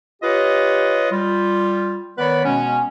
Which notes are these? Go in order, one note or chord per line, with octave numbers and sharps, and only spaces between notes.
F4 G4 B4 C#5 D#5
G3 F4
D#3 B3 B4 C#5 D5 B5
B2 G#3 B3 C#4